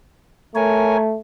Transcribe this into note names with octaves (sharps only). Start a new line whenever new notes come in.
A3 A#4 C#5 G#5